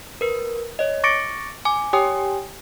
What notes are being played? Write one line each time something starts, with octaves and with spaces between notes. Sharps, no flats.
A#4 B4
C#5 D#5
C#6 D6 A6 A#6 C#7 D7
G#5 D6
G4 C#5 G5 G#5 D#6